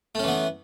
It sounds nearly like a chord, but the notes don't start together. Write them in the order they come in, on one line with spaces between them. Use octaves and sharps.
A3 C#4 E3 B3